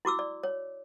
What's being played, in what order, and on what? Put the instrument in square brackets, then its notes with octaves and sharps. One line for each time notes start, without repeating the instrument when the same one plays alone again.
[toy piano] E4 F#4 D6 E6
D5
C#5